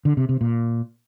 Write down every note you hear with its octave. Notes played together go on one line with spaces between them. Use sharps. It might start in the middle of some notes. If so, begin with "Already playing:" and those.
D3
C3
C3
A#2